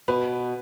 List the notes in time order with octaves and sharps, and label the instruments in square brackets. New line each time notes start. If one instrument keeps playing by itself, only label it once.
[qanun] B2 [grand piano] B4